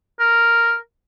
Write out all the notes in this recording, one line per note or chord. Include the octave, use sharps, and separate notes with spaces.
A#4